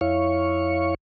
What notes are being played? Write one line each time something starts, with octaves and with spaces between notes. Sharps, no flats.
F2 E4 C#5 F5 C#6